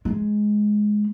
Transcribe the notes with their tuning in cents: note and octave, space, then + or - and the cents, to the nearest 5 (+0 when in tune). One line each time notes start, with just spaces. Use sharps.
G#3 +10